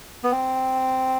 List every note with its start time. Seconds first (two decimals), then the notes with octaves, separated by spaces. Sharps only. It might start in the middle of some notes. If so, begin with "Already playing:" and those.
0.23 B3
0.32 C4